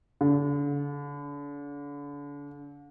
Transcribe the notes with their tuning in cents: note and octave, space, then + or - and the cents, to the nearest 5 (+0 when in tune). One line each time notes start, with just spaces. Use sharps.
D3 -35